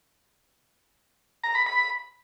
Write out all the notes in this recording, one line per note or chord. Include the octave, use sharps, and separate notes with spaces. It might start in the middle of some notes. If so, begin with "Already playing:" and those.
A#5
B5
B5